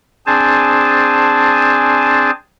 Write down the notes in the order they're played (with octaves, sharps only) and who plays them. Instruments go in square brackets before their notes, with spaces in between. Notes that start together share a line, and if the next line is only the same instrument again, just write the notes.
[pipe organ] C4 D4 G#4 C5 G#5 A5